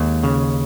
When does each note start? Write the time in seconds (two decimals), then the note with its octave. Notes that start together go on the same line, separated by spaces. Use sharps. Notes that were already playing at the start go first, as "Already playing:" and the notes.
Already playing: D#2 G#3
0.23 C#3